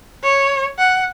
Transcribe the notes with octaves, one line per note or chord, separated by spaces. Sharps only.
C#5
F#5